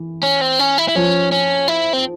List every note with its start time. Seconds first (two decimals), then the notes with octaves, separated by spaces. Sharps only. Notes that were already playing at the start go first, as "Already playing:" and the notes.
Already playing: E3
0.23 C#4
0.41 C4
0.59 C#4
0.78 E4
0.88 E4
0.95 F3 C#4
1.32 C#4
1.68 E4
1.93 C4